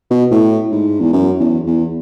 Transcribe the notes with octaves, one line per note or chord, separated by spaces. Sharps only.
B2
A2
G#2
E2
F#2
E2
E2